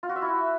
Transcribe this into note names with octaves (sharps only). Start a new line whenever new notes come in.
F4
F#4
E5
E4